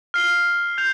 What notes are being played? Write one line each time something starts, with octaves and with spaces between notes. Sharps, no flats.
F6 C7 G7
G6 F7